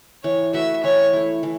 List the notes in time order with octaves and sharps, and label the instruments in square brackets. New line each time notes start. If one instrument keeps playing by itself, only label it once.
[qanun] E3 [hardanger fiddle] C#5
[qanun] A3 F#4 B4 [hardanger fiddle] E5
[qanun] E3 [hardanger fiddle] C#5
[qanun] A3 E4
E3